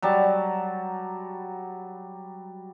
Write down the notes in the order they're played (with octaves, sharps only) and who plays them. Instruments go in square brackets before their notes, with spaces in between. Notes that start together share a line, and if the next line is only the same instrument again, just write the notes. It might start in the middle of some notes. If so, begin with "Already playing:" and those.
[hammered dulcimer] F#3 G3 A5